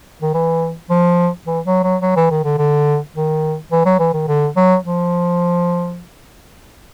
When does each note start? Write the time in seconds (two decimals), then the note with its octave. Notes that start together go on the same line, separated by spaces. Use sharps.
0.22 D#3
0.34 E3
0.90 F3
1.47 E3
1.65 F#3
1.83 F#3
2.02 F#3
2.16 E3
2.31 D#3
2.44 D3
2.58 D3
3.15 D#3
3.72 E3
3.85 F#3
3.99 E3
4.13 D#3
4.28 D3
4.56 F#3
4.84 F3